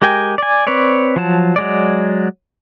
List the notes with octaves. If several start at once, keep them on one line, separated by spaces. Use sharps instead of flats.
G#3 G4 A#4 G5 G#5
D5 G#5
C4 B4 C#5 D5
F3 F#3 A5
F#3 G#3 D5